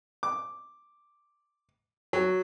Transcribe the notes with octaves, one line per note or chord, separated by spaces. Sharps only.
D6
F#3